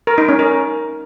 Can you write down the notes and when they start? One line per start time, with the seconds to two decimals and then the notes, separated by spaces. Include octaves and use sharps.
0.07 A#4
0.18 D#4
0.28 C#4
0.39 A#4